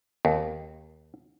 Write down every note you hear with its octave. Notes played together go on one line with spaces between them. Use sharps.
D#2